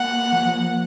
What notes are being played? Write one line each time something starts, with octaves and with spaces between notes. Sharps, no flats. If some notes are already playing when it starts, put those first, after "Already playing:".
Already playing: A#3 F#5
F3